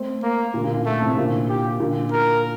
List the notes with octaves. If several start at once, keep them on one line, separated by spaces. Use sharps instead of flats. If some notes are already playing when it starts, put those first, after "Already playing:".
Already playing: A3 C4
A#3
A#2 D3
A#2
A#2
A3
A2 C3
A#2 D3
G4
A#2 D3
A#4